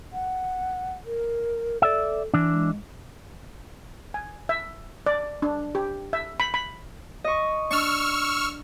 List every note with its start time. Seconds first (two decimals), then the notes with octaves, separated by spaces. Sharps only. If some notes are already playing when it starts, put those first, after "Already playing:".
0.13 F#5
1.05 A#4
1.82 A4 D5 E5
2.34 E3 D4
2.52 G#3
4.14 G#5
4.49 E5
5.06 D5
5.42 D4
5.75 G4
6.13 E5
6.40 B5
6.54 B5
7.24 D#5 C#6
7.71 D4 C#6 E6 F6